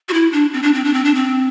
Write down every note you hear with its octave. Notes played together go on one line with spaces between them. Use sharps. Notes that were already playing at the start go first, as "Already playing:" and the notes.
F#4
E4
D4
C4
D4
C4
D4
C4
D4
C4